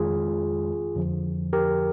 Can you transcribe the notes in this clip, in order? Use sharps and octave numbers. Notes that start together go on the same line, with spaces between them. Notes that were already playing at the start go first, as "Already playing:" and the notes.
Already playing: F2 D#3 G#3 F4 G#4
F2 D3 F3
G4 A#4